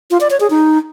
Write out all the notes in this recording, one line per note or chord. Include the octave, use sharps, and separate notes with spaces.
F4
D5
C#5
G#4
D#4